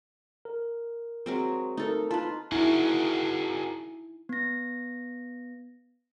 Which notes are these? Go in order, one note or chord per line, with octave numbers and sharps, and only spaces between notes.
A#4
F#3 G#3 C4
A3 D#4 A4 A#4
F4 B4 A5
D#4 E4 F#4 G#4 A#4
B3 A#6